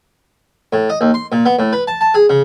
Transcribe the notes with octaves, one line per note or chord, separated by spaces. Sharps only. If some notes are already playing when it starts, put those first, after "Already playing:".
A2
D#5
D#2
C6
A#2
B3
A2
B4
A5
A5
G#4
C#3